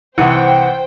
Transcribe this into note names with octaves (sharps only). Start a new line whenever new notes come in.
C2 E3 C5 F#5 G5